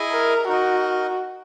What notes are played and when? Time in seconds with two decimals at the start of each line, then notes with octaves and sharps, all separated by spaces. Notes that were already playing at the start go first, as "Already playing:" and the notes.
Already playing: E4 G#4 D#5 G#5
0.12 A#4
0.49 D#4 F#4 A#4 D#5